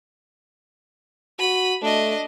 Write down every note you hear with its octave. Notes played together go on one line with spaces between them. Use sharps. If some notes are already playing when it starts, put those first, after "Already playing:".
F#4 B5 D#7
A3 D4 D#5